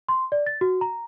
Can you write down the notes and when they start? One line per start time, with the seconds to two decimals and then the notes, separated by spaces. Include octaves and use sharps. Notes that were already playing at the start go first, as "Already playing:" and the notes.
0.09 C6
0.32 D5
0.46 A6
0.61 F#4
0.81 A#5